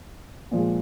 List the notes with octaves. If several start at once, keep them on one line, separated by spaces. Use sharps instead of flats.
A#2 F3 G#3